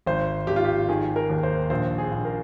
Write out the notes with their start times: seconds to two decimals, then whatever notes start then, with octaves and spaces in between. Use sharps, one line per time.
0.06 G#1 C5
0.47 G#1 G4
0.56 F4
0.65 G4
0.89 D#3 G#4
1.16 A#4
1.30 D#2
1.43 C5
1.70 A#1 C5
1.98 G#4
2.11 A#1
2.25 A#4